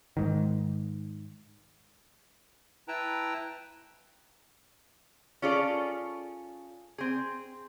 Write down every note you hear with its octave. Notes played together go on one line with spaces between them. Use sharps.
G#2 D#3
E4 B4 G5 A5 A#5
C#4 F4 G#4 A4 D5
C4 G#4